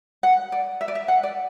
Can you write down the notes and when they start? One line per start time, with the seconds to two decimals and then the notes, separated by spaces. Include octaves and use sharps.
0.23 F#5
0.52 D5
0.81 E5
0.88 D5
0.95 E5
1.08 F#5
1.23 D5